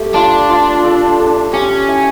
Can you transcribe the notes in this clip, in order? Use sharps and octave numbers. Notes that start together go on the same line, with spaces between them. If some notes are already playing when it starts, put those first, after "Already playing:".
Already playing: A3 G4
D4 F4
F4
A4
A4
C#4 G4
E4